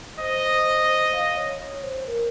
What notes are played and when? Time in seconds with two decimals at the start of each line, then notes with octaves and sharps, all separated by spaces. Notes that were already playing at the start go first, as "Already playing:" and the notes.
0.20 C5 D#5
1.13 F5
1.37 C#5
1.60 C#5
1.83 C5
2.07 A#4